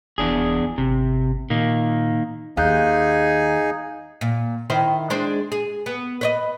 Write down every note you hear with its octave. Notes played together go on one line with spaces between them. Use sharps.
F1 E2 D4 G#4
G#1 C3
A#2 D#3 A#3
D#2 D#4 G#4 F5 G#5 F#6 G6
A#2
D#3 E4 C5
G#3 D4 C5
G#4
B3
B4 C#5 D#5